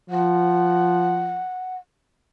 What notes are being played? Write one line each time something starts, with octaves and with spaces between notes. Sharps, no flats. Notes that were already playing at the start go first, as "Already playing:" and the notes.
F3 F#5